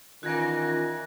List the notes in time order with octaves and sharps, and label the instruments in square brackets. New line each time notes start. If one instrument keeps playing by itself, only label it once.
[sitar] A#2 E3 [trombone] D#3 [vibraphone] C#4 F4 [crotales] F#6 G#6 A#6